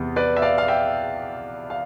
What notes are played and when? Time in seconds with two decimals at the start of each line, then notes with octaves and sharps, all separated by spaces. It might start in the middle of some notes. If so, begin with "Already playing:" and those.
Already playing: E2 C3 B3
0.16 B4 D5
0.36 E5
0.42 D5 F5
0.58 F5
0.68 E5 G5
1.70 F5